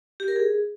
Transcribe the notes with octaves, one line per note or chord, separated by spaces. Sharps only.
G4
A#4
G#4